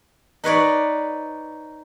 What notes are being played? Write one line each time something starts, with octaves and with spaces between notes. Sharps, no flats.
D#4 B4 C#5 D5